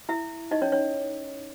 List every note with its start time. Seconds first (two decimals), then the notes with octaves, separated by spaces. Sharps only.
0.09 E4 E5
0.51 D#4 D#5
0.62 C#4 C#5
0.72 C#4 C#5